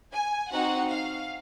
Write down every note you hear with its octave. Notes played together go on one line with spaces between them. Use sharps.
G#5
C4 D#4 F#4 F#5
F5